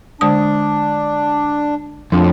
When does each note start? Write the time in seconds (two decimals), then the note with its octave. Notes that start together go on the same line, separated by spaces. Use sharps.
0.21 D3 G#3 D4 D#6
2.12 F2 A2 F3 D4